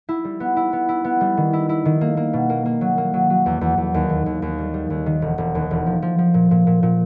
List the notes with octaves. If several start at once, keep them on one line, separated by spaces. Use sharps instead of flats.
E4
G3
B3
E4
B3
E4
B3
G3
D#3
E4
E4
D#3
A#3
A#3
B2
A#3
A#3
F#3
A#3
F#3
F#3
E2
E2
E2
D#2
D#3
D#2
D#2
G3
G3
D#2
D#3
E1
E1
D#2
E1
F3
F3
F3
A#2
A#2
A#2
A#2